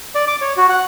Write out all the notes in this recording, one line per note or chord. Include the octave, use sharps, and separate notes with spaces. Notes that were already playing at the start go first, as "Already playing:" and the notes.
D5
D6
C#5
F#4
F#5